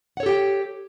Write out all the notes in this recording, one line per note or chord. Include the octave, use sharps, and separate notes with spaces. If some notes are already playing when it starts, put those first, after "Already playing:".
G4 A4 C#5 F#5 G5